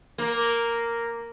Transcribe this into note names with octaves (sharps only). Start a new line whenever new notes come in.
A#3